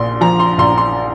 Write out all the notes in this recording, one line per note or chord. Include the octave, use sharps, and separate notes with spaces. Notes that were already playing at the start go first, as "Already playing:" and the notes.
Already playing: A#1 A#2 C6
F3 A#5
C6
A#1 C6
C6